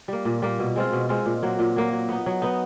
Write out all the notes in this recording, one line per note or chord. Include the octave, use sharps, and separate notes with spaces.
G3 A#3
A#2
G3 A#3
B2
G#3 C4 F4
B2
G#3 C4 F4
A#2
F#3 A#3
A#2
F#3 A#3
F#3
B3 D#4
F#3
B3 D#4